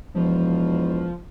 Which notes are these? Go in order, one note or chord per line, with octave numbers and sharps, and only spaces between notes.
E1 F3